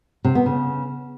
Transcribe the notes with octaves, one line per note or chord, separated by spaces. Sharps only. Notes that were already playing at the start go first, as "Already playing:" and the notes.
C3
B3
C#3